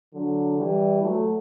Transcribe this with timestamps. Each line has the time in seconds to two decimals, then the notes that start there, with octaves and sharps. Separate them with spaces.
0.14 D3 F#3
0.58 E3 G3
1.02 F#3 A3